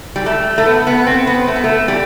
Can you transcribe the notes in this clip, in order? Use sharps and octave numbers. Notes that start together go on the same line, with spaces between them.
G3
A3
A3
B3
B3
C4
B3
A3
B3
A3
G3